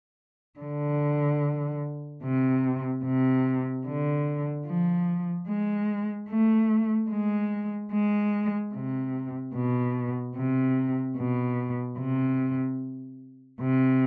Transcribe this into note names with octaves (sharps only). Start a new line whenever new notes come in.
D3
C3
C3
D3
F3
G#3
A3
G#3
G#3
C3
B2
C3
B2
C3
C3